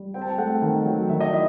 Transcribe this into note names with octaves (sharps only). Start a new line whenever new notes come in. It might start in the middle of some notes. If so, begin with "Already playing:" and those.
Already playing: G3
C4 G5
A5
G5
A3 F#5
D#3
F#3
D#3 E5
D#5
E4 E5